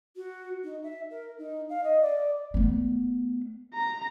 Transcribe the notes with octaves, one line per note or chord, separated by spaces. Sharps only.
F#4
D#4
E5
A#4
D#4
F5
D#5
D5
A3 B3
A#5